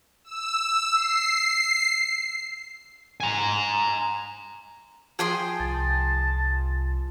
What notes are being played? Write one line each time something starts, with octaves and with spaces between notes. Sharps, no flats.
E6
C7
G#5 A#5
F3 G#4 G5 C6
C2 A5